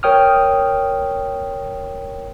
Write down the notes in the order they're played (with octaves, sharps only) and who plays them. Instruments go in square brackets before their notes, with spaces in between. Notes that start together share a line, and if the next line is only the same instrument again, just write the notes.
[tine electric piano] A#4 C#5 G5 D#6 F6